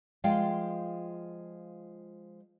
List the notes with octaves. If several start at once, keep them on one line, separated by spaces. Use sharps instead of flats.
F3 G#3 F4 F5 G5